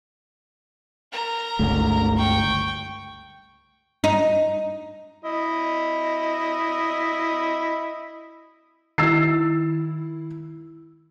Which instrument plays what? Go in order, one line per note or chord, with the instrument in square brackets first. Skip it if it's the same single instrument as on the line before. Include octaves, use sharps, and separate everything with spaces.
[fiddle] A#4 A#5
[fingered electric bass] G1 C#2 A3
[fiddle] G5 C#6
[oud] D#4
[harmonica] E4 D#5
[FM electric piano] D#3 E4 [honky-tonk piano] E6 A6 C7